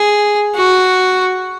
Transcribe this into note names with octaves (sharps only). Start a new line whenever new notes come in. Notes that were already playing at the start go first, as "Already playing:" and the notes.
Already playing: G#4
F#4